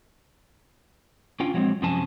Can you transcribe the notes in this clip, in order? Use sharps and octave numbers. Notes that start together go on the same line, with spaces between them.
C#4 D4 F4 G5
F3 F#3 G#3 A#3 C4
F#2 C3 F3 C#4 G#5 A5